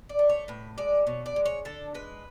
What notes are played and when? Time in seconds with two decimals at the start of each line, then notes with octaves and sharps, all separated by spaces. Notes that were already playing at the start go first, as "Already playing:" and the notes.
0.09 D5
0.19 A3
0.29 C#5
0.48 A2 B4
0.78 G#3 D5
1.07 B2 C#5
1.26 D5
1.36 G#3
1.46 C#5
1.65 D3 A4
1.94 G#3 B4